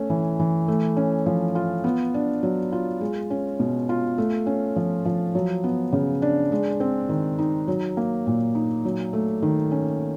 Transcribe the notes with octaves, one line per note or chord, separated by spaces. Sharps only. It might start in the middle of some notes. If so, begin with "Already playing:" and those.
Already playing: A3 C#4
E3
E3
A3
C#4
F3
F4
B3
D4
F#3
F4
G#3
C#4
B2
F4
A3
C#4
F3
F3
F#3
B3
C#3
D4
G#3
C4
D#3
D#4
F#3
A#3
A#2
D#4
F#3
A3
D#3
C#4